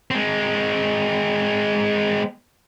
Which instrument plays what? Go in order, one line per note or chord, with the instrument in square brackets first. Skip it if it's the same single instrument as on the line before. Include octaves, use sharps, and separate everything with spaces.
[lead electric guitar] G#3 C4